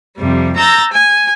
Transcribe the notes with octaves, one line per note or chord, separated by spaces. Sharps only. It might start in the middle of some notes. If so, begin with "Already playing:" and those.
F2 C3 G3
A#5 E6 G6 A6 A#6
G#5